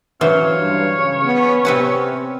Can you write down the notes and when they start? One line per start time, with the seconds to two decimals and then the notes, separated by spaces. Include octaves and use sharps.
0.21 E3 F#3 C#4 C5 C#5 F5
0.57 G2
0.95 C#3
1.24 B3 C#4
1.65 C3 C4 B4 F#5